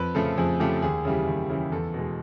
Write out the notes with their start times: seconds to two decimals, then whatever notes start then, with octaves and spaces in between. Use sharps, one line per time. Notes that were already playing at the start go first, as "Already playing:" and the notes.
Already playing: F2 B4
0.15 C#3 F3 A3 A4
0.37 F2 G#4
0.60 C#3 F3 A3 G4
0.82 D#2 G#4
1.05 C#3 E3 G3
1.27 D#2
1.50 C#3 E3 G3
1.72 E2 A4
1.94 B2 G#3